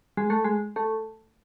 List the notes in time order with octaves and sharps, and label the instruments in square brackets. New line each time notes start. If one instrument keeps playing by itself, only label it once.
[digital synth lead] G#3
A3
G#3
A3